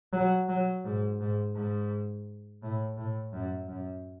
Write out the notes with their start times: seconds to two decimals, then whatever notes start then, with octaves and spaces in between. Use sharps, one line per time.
0.13 F#3
0.49 F#3
0.84 G#2
1.20 G#2
1.55 G#2
2.63 A2
2.97 A2
3.33 F#2
3.68 F#2